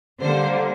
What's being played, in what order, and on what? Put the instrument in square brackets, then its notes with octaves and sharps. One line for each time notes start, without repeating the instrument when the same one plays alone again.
[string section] D3 G3 A#3 C5